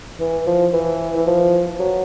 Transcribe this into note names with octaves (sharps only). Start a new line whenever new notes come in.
E3
F3
E3
E3
F3
F#3